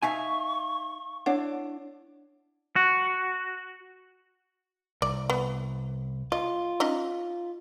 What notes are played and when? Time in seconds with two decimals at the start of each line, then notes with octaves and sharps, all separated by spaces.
0.02 D#4 E5 F5 G#5 C#6
1.26 D4 E4 C#5 D5 F#5
2.76 F#4
5.02 C2 D5
5.30 B3
6.32 F4 D#5
6.80 C#4 D#4 D#5